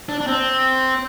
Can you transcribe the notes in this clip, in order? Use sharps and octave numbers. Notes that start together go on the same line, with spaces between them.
D4
D4
C4